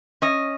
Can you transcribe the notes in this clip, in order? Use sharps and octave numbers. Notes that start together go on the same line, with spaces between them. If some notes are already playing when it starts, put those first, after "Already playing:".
C#4 D#5